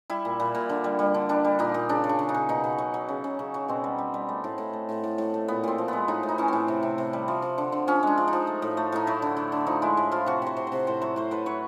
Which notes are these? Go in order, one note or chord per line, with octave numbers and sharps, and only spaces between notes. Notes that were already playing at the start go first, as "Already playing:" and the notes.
G3 E4
A#2
A#2
A#2
D3
G3
G3
D3
G3 D4
G3
A#2 D#4
A#2
C#3 D4
C#3
D4
C#3
D#4
C#3
B2 D#4
B2
F#3
F#3
C#3
C#3
C#3
F#3
B2 C4
G3
G3
G3
A3
A2
A2
A3
A2
A2
A2
A3
A#2 B3
A#2 C4
F3
G#3 B3
A2 D#4
A2
D#4
E3 C#4
A2 C4
C3
C3
C3
G3
F3
F3
D3
D3
F3 C#4
G#3 D4
F3
D#4
F3
A3
A2
A3
A2 D#4
F#3 E4
D3
D3
D3
F3 D#4
G#3 E4
A2
F3 F4
C3 F#4
C3 C5
C3
C3 C5
A2 C5
F#3 C5
A2 C5
A2 B4
F#3 C#5